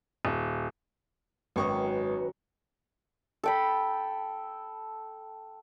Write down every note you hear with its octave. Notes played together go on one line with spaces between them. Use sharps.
D#1
G#1 F#2 D#3 B4 C#5 C#6 D#6
A4 G5 B5